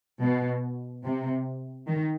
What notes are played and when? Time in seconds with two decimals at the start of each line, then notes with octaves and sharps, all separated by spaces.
0.22 B2
1.04 C3
1.87 D#3